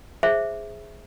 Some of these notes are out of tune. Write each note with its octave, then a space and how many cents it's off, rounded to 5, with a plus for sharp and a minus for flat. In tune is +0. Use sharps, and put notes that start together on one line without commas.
G#4 +0 C5 +0 E5 +0